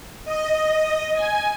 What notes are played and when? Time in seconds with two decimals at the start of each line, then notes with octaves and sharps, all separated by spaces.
0.25 D#5
1.14 G#5